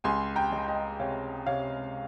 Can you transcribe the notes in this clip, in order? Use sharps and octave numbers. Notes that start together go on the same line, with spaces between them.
C#2 G#5 C6
G5 A#5
G#3
D#5 G5
C3 C#5 F5
C3 C#5 F5